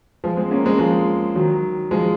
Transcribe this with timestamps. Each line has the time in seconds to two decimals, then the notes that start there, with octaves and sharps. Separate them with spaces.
0.24 F3 G#3
0.37 G#3 C4
0.51 A#3 C#4
0.65 G#3 C4
0.79 F3 G#3
1.36 D#3 F#3
1.91 F3 G#3